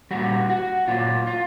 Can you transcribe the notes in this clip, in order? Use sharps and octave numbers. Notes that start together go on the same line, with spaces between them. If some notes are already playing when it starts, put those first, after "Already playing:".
A#2 G3 F#4
F#4
A#2 F#3 F4
F4